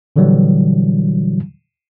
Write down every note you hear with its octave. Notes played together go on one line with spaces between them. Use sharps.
A#2 D3 E3 F#3 G3